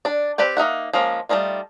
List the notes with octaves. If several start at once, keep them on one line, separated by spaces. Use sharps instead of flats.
D4 D5
C4 G4 B4 D5 G5
A#3 D#4 E5 F#5
F3 G#3 A#3 C#4
G3 A3 C#4 D#4 F4